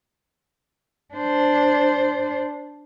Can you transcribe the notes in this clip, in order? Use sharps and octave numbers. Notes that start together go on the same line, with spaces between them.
D4 C5